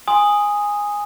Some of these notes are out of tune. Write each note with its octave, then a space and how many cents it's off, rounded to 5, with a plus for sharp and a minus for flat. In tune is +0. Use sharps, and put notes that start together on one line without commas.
G#5 -10 C6 +0 D#6 +0